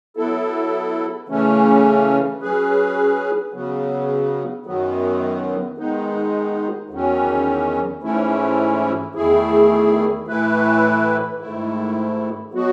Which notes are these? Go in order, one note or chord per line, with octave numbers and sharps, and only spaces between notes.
F#3 B3 E4 A4
C#3 E3 A3 C#4
F#3 C#4 G#4 B4
C#3 F#3 B3
F#2 D#3 F#3 B3
D#3 G#3 B3 D#4
E2 D#3 F#3 C#4
G#2 E3 A3 C#4 E4
E2 D#3 A3 E4 G#4
A2 E3 A3 E4 B4
G#2 D#3 A3 E4
B2 F#3 B3 F#4